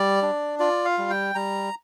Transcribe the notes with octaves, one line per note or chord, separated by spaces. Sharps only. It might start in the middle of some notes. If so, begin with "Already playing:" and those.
Already playing: G3 D5
D4
F4 D5
F5
G3
G5
G3 A#5